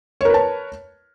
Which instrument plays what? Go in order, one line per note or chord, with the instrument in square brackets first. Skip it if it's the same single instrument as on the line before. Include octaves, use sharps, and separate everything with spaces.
[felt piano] C#5
A#4
B4
A5